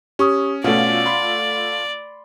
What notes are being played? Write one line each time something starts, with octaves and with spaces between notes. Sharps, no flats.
C#4 G4 C#6 D#6
B2 A3 C#4 F4 D5 F#5
B5 C6